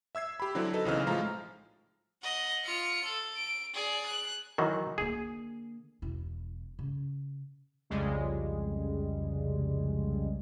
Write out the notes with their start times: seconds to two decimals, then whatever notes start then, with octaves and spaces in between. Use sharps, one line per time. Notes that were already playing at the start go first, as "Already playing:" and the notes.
0.15 E5 E6 G#6 C7
0.40 G4 B5
0.55 D3 F#3 C4 E4
0.73 D#4 A4 B4
0.85 B1 C#3 E3 C4 D#4 F6
1.07 A2 F3 G#3 F4 A#5
2.24 D#5 F#5
2.65 F4 C#7
3.05 A4
3.37 D7
3.74 G#4 D5
4.06 F#6
4.58 D#3 E3 F#3
4.98 D3 A#3 G#4
6.02 E1 E4
6.79 C#3
7.90 C2 F2 C#3 G3 G#3